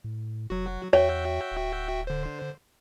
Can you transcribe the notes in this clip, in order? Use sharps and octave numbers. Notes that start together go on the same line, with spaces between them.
A2
F1 F#3 F#4
E2 F#4 C#5 E5 G5
D1
D3 C5